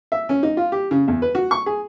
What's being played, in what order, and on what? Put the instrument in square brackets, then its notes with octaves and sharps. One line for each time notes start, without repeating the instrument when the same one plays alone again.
[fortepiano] E5
C#4
D#4
F4
G4
C#3
E2
B4
F#4
C#6
G#4